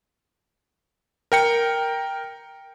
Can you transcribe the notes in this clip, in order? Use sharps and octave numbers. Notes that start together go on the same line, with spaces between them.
A#4 G5 C#7